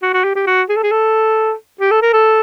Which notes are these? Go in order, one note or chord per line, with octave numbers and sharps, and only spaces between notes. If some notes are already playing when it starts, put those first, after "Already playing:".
F#4
F#4
G4
G4
F#4
G#4
A4
G#4
A4
G4
A4
A#4
A4